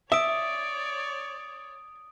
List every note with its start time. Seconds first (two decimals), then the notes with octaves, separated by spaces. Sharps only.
0.12 C#5 D5 E5 D#6 D7